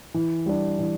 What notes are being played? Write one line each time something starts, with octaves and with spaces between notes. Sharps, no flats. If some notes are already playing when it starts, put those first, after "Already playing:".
E3
G3 D4
E3